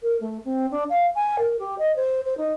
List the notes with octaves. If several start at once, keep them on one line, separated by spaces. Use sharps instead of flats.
A#4
A3
C4
D4
F5
G#5
A#4
G4
D#5
C5
C5
D#4